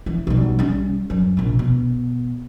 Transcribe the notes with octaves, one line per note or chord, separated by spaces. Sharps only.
E3
B1 G3
G3 C#4
F#2
A#1 C3
B2